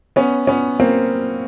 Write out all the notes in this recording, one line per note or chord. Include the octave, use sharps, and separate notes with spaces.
B3 C#4
B3 C#4
A#3 C4